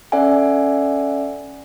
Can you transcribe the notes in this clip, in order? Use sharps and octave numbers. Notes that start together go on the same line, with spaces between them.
C#4 A4 D5 E5 F#5 G#5